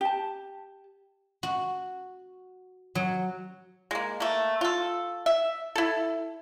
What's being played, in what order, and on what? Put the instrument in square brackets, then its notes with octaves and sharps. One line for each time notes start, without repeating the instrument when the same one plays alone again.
[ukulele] G4 A5
[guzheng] F#4
F#3
[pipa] G#3 A#3
A3 A#3
F4 A4
E5
E4 A4